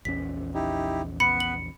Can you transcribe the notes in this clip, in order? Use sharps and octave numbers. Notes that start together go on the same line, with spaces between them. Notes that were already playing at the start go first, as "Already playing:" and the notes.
A#1 E2 C#4 B6
D#4 E4 G4
B3 B4 B5 C#7
F#7